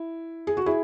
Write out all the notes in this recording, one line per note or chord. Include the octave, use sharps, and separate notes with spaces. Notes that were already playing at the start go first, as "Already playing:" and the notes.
Already playing: E4
G#4
F#4
E4 G#4